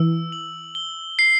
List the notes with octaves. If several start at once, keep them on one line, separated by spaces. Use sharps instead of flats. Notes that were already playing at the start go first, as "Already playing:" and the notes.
Already playing: E3 E6
F#7
G7
C7